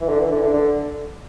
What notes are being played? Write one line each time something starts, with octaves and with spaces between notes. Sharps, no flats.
E3
D3
E3
D3
D3
D3